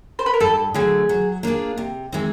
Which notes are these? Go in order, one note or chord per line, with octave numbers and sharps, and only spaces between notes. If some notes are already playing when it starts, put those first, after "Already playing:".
C5
B4
A#4
G2 A4
D3 F#3 A3 G#4
F#3
A#3 D4 F4 G#4
C3
E3 G#3 C4 D#4